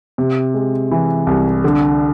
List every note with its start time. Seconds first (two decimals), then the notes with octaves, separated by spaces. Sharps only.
0.18 C3
0.54 G#3
0.91 E3
1.27 C2
1.64 D3